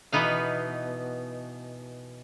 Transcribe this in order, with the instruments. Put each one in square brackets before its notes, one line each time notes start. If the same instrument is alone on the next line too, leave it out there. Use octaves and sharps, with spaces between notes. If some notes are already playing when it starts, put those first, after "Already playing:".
[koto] B2 E3 B3 D#4 F5